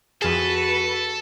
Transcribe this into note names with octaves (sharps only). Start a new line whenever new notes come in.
F2 F#4 G#4 A4 B4